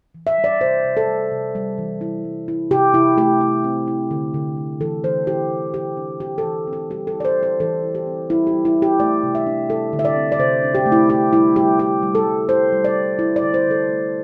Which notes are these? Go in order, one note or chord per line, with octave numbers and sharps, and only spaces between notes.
E3
E5
G3
D5
C3 C5
C3
A4
G3
C3
G3
E3
E4
G3
E4
C3 G4
C3 E4
A3 G4
E4
C4
E4
D3
D3
A3
E3 A4
E3 C5
E4 G4
D3
D3 G4
D4
C4 G4
A4
E3
C4
A4
G3 G4
A4
E4
D5
C5
G3
C5
E3 A4
E4
G4
C4
G3 E4
G4
G3
E4
G3
G4
A3 D5
C3
E5
D4
G3 A4
D3
E5
D5
C4
D5
C3 C5
D4
G4
A3
E4
E4 G4
G3 E4
G3 G4
E4 G4
G3
A4
G3
E4 C5
G3
D5
E4
E4
D5
D3
C5
D3
A4
A3